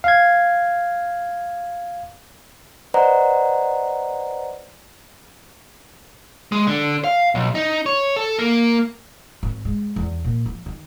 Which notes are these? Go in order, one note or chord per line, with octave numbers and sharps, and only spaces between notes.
F5 G#6
B4 C5 D5 D#5 F#5 A#5
G#3
D3
F5
B1
D#4
C#5
A4
A#3
G#1
G#3
E2
A#2
F3
D#3